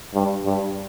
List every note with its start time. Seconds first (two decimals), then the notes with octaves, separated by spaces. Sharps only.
0.14 G2
0.45 G2